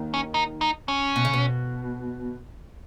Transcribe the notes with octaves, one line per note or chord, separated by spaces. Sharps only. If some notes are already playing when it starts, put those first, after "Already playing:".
Already playing: D#2 D#3
C#4
D#4
D#4
C#4
B2
C#3
B2